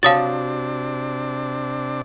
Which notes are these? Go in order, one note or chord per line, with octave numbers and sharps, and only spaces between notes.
C3 D4 F#4 C#5 F5 A5 D#6 A6